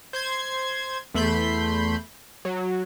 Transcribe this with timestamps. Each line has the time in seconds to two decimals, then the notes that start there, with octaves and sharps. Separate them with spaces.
0.13 C5 C6 G#6
1.14 E2 A3 B5 C6 G6
2.45 F#3